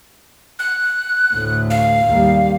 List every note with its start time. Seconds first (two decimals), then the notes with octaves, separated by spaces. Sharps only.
0.59 F#6
1.33 D2 A2
1.70 F5
2.05 D#2 G3